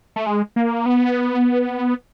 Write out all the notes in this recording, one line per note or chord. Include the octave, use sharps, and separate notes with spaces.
A3
G#3
A#3
B3